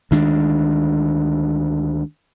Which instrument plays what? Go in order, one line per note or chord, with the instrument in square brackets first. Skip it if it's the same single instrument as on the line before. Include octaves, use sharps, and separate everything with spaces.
[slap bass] D2 D#3 G#3 D4